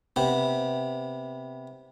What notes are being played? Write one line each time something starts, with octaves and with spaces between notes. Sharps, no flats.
C3 B3